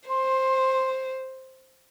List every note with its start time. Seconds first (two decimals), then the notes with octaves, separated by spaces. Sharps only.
0.09 C5 C6